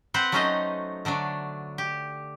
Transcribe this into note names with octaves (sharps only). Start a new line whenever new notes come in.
C4 B4 C5 F#5
F#3 A3 C#4 D#4 C5 D#5
D3 F#3 A3 D4
G4